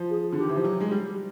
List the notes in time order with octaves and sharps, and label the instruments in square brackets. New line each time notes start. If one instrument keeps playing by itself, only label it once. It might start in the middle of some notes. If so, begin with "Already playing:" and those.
Already playing: [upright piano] F3
[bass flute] G#4
[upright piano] D3
[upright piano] D#3 [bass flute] G4
[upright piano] E3
F3
F#3
G#3
G3